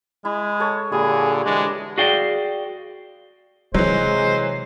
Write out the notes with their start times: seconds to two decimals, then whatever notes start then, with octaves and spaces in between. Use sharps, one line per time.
0.25 G#3 E4
0.60 A4 C#5
0.92 A#2 D3 G3 G#4
1.45 D3 E3 G#3 D4
1.98 F#4 G#4 D5 F5 G5
3.74 C3 E3 F#3 G#3 C5